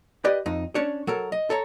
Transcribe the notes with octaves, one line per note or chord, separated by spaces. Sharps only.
G4 B4 D5 D#5
F2 D#4
C#4 D4 C#5
F#3 A4 A#4
D#5
A4 C#5 A#5